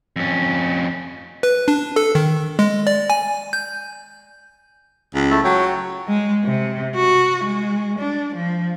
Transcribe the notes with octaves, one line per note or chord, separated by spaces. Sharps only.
F2 C#4
B4
D4
A4
D#3
G#3
D5
G#5
G6
C#2
A3 E4 A5
F#3 C#5 G5
G#3
C3
F#4
G#3
D4
F3